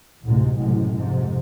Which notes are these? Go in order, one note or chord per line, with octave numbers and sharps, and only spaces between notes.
A1 D2 G#2 C3 G#3
F#1 F#2 A2 C3 G#3
F2 G#2 C3